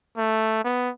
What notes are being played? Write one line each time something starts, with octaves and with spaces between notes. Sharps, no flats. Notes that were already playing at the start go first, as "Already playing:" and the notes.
A3
B3